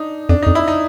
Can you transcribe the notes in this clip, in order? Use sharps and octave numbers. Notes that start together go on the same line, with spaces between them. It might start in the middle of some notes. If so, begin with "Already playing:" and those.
Already playing: D4 D#4
F2 D4
F2 D#4
E4
D#4